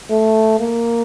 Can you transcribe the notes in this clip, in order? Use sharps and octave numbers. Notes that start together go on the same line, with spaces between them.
A3
A#3